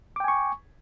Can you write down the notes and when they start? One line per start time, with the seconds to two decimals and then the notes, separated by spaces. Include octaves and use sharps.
0.16 D6
0.20 G5
0.24 G#5
0.28 C#6